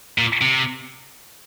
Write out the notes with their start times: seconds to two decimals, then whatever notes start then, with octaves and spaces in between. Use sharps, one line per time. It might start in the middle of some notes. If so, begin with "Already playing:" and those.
0.18 A#2
0.41 C3